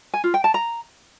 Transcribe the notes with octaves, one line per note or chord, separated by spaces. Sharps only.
G#5
F4
G5
A5
A#5